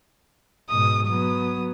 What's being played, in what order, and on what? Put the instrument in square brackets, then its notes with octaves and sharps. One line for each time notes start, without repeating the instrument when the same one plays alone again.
[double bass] G#2 B2 [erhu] D#6
[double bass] F#3 B3 [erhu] D#6